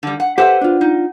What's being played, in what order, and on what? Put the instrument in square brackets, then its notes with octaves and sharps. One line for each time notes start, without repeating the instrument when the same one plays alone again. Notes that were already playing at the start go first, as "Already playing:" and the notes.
[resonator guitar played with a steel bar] D3 G3
F#5
[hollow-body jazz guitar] G4 A4 E5 [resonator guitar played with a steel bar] B4 C5 F#5
[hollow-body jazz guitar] D4 F4
[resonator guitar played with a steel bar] D#4